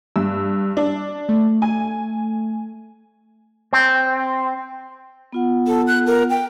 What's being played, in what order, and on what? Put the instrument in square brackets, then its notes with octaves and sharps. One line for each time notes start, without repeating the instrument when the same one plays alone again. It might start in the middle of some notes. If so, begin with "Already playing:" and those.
[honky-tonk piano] G2 [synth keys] E6
[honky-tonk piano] D4
[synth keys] A3
[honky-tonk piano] G#5
[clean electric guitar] C4
[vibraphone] B3 F4 F#5
[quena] A4
F#6
A#4
G5